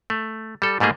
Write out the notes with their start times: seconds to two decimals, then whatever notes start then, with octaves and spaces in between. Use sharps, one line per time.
0.10 A3
0.62 G3 A4
0.80 G#2 G3 A3 A#3 G#4